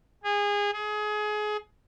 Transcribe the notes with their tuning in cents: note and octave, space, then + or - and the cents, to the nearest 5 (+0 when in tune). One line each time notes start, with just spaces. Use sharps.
G#4 -25
G#4 +25